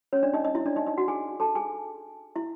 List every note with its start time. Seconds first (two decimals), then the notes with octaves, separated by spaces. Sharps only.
0.13 C#4 C#5
0.23 D4 D5
0.33 D#4 D#5
0.44 D#4 D#5
0.55 E4 E5
0.66 D4 D5
0.76 D#4 D#5
0.86 D#4 D#5
0.97 F#4 F#5
1.08 G#4 G#5
1.40 A4 A5
1.55 G#4 G#5
2.36 E4 E5